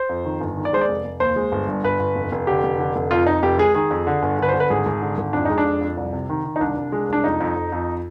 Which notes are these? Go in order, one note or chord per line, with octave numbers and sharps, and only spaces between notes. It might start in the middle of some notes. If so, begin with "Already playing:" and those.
Already playing: C5
F2
D#3
G1
D#3
D5
G#3 C5
D5
F1
F1
D#2 C5
G#3
G1
G2
G1 B4
G1
F1
F1
D3 G4
F1
D3
F1
F2 F4
F2 D#4
F1 G4
G#3 G#4
D#3 G#4
F2
D3
G1
D3 B4
C5
D3
B4
G#1 G#4
G#1
D3
G#1
F2 D4
G#3 D#4
D4
F2
F2
C2
C3
D#3
D#3
D#4
C2 D4
C2
G#3
C2 D4
F2 D#4
F2
F2
F2